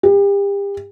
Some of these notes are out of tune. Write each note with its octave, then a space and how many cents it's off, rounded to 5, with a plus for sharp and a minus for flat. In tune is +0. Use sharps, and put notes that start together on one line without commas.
G4 +35